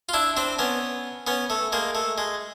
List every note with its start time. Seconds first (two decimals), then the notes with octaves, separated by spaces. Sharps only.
0.09 F4
0.13 D4 E4
0.37 C4 D4
0.59 B3 C#4
1.27 B3 C#4
1.50 A3
1.72 G#3 A#3
1.95 A3
2.18 G#3